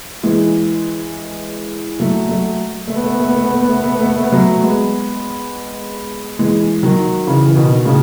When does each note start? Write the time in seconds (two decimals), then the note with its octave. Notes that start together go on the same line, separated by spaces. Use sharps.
0.23 E3 G#3
2.00 F#3 A3
2.29 F#3 A3
2.88 A3
2.96 B3
3.04 A3
3.12 B3
3.20 A3
3.28 B3
3.36 A3
3.44 B3
3.52 A3
3.60 B3
3.68 A3
3.76 B3
3.83 A3
3.92 B3
4.00 A3
4.07 B3
4.16 A3
4.24 B3
4.32 F#3 A3
4.63 G#3 B3
6.39 E3 G#3
6.83 D#3 F#3
7.27 C#3 E3
7.48 E3
7.55 B2 D#3
7.85 A2 C#3